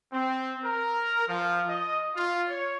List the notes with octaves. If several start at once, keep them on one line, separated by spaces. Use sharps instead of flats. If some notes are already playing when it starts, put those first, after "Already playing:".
C4
A#4
F3
D#5
F4
C#5